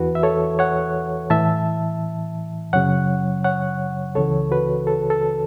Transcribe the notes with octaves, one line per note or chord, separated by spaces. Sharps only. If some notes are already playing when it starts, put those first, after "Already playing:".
Already playing: E2 E3 F#4 B4
E5
A4 C#5
C#5 F#5
A2 E3 E5 A5
F#2 C#3 F#3 C#5 F#5
C#5 F#5
C#2 C#3 E3 A4 C#5
F#4 B4
A4
A4